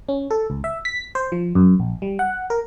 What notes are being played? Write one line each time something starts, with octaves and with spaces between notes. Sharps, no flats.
C#4
A4
C#2
E5
B6
C5
F3
F#2
A#1
G3
F#5
A#4